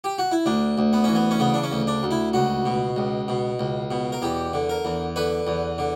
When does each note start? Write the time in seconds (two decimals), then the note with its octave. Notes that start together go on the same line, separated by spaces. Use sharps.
0.04 G4
0.18 F#4
0.31 E4
0.46 D2 D4
0.78 D2
0.93 B3
1.04 E3 C#4
1.15 B3
1.31 C#4
1.39 C#3 B3
1.54 D4
1.63 C#4
1.72 D2
1.87 D4
2.03 D2
2.11 E4
2.33 C#2 F#4
2.65 B2
2.96 C#2
3.28 B2
3.59 C#2
3.91 B2
4.12 A#4
4.22 E2 G4
4.53 D3
4.69 A#4
4.85 E2
5.16 D3 B4
5.47 E2
5.78 D3